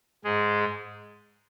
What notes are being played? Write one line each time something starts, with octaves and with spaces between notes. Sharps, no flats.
G#2 G#3 G#4